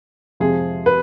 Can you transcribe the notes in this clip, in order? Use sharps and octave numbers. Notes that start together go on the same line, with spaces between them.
F2 C3 F3 G#3 G#4
B4